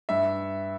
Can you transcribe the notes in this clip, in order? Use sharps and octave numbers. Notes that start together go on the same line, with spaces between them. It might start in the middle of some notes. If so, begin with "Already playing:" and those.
G2 E5